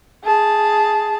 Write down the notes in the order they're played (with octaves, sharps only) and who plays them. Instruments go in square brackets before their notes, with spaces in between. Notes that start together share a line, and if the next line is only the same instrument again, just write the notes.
[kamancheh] G#4 A5